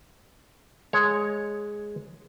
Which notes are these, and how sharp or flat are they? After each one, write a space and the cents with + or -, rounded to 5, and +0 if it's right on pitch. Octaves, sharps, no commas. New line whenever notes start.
G#3 +0 C#5 +0